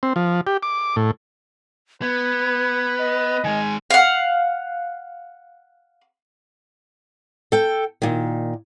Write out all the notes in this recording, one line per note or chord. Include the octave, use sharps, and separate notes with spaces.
C4
F3
G4
D6
A2
B3 B4 G#6
D#5
D#3 G#3 G#5
F5 F#5
A4 G5
A#2 D#3